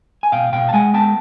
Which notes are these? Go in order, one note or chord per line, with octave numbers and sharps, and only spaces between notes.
G#5
B2 F5 G5
B2 F5 G5
A5
G#3 F#5 G#5
B3 G5 A5